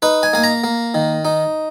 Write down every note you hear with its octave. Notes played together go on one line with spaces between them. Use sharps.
D#4 B4
G#5
A#3 G#5
A#5
A#3
D#3
D#4